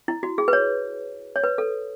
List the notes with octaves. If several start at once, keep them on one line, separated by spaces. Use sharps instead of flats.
E4
F#4
G#4
B4
C#5
C#5
B4
A4